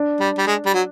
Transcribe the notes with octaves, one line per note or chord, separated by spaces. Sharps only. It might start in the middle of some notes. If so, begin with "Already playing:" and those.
Already playing: D4
G3
G3
G#3
G3
F#3